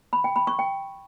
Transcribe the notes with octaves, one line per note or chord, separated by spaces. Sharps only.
B5
G5
B5
C#6
G5